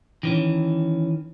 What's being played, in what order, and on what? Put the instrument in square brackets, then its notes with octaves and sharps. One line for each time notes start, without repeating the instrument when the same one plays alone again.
[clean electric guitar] D#3 E3 C#4